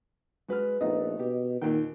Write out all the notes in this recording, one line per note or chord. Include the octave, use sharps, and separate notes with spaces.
G#3 F#4 B4 F6
A#1 A3 B3 D#4 D#5
B2 G4
D#2 A#2 D#3 G5